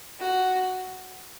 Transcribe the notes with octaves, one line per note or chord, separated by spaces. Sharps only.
F#4